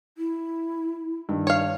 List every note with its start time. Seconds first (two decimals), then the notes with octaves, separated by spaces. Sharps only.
0.18 E4
1.29 G2 D#3
1.47 C#5 F5